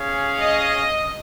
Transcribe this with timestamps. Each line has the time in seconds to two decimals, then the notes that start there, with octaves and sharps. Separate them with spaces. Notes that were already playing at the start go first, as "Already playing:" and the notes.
Already playing: C#4 G#4 C#5 F5
0.41 D#5